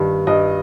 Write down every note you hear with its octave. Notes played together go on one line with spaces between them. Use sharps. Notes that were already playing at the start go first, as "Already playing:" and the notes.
Already playing: G2 D#3
G2 D#5